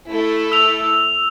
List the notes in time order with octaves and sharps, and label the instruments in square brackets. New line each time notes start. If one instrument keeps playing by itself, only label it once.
[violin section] A3 E4 A4
[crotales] E6 F7